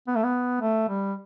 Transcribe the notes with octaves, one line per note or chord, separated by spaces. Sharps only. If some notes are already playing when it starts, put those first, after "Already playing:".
B3
A3
B3
A3
G3